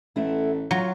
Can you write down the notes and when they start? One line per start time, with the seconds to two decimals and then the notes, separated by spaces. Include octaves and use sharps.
0.16 A1 A3 B3 E4
0.71 F#3 F4